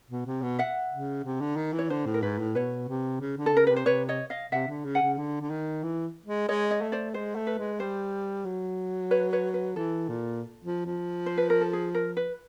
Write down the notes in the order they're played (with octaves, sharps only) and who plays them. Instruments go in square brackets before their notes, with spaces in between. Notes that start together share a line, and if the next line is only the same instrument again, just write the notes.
[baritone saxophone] B2
C3
B2
[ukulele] E5 F#5
[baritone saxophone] C#3
C3
D3
D#3
E3
[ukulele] C#5
[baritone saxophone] D3 [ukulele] C5
[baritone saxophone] A2
[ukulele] A#4
[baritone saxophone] G#2 [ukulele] B4
[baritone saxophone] A2
[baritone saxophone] B2 [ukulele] B4 C#5
[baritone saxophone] C3
C#3
D3
[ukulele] A4
[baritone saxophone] C#3 [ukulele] A#4
[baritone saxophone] C3 [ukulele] B4
[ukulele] C5
[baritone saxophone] C3 [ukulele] B4 C#5
[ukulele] C#5 D#5
D#5 F5
[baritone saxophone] C3 [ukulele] E5 F#5
[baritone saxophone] D3
C#3
[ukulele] F#5 G#5
[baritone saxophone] C#3
D3
D3
D#3
E3
G#3
[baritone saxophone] G#3 [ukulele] C#5 D#5
[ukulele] C#5 D#5
[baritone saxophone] A3
[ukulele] C5 D5
[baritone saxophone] G#3 [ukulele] C5
[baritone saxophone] A3
[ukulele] B4
[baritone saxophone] G#3
[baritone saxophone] G3 [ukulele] C5
[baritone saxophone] F#3
[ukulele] B4 C#5
B4 C#5
B4
[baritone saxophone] E3 [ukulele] A4
[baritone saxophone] A#2
F3
F3
[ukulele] C5
B4
A#4
A4
G#4
A#4
B4